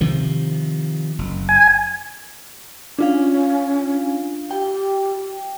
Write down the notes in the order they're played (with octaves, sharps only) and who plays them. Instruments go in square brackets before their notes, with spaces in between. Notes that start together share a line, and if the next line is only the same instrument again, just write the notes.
[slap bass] C3 D#3 F3
F#1
[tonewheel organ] G#5
[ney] C#4 [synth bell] D4 F4 F5
[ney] G4 [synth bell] G5